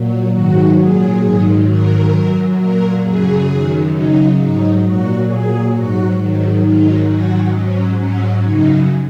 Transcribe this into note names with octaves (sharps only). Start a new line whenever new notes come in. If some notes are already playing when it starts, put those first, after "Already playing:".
Already playing: A#2 F#3
G#2 D#3 F#3 F#4
A#2 F#3 G#4
G#2 D#3 F#3
G#2 D#3 F#3 A#4
F#2 F#3
A#2 F#3 A#4
F#2 C#3 F#3 G#4
F#2 D#3 F#3
F#2 C#3 F#3 D#4
G#2 F#3 D#4
A#2 F#3 F#4
A#2 F#3 G#4
G#2 F#3 F#4
G#2 D#3 F#3
G#2 D#3 F#3 D#4
G#2 D#3 F#3 F#4
G#2 F#3 C#4
G#2 F#3 C#4
F#2 C#3 F#3 D#4